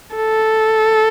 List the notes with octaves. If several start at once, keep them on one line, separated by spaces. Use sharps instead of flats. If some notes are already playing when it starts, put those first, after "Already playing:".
A4